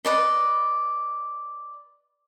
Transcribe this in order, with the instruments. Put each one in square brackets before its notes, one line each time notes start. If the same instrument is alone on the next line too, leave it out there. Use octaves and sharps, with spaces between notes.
[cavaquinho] B4 D5 D#5